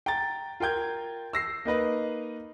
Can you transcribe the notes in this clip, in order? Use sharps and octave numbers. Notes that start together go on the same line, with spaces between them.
G5 A#5 A6
F4 A#4 G5 G6 G#6
E6 A#6 C7
A#3 D#4 B4 D#5